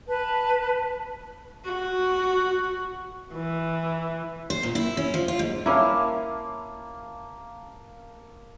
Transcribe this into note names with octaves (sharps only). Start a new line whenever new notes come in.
B4 A5
F#4
E3
C5
A#2
E4
C#4
F3
F4
G#2
A#3 C#4 E4 F5 A5